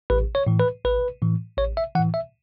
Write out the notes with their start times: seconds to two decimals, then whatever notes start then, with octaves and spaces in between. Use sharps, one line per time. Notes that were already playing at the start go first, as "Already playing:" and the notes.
0.10 A1 B4
0.35 C#5
0.47 A2 E3
0.60 B4
0.84 A1 B4
1.22 A2 E3
1.58 A1 C#5
1.77 E5
1.95 E3 F#5
2.00 A2
2.14 E5